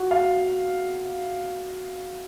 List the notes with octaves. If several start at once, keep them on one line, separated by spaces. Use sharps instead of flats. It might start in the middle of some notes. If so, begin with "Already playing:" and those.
Already playing: F#4
F5